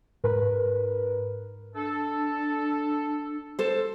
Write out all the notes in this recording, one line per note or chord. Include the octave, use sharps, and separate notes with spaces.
G#2 A#4 B4
D4 A4
A4 C5